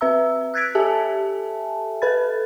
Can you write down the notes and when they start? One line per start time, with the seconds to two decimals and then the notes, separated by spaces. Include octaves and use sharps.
0.01 C4 B4 E5 A#5 E6
0.54 E6 F#6 G#6 A6 B6 D7
0.75 G4 A4 E5 G#5 A5
2.02 A4 B4 B5 A6